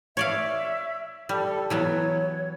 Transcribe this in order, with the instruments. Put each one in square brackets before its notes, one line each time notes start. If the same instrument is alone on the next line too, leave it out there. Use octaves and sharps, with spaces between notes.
[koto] C#5 D5 F5 [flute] E5
[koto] G3 [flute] A4
[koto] E3 F#3 B3 [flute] C#5